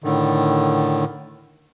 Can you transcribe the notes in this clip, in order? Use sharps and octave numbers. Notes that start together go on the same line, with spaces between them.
A2 D3 D#3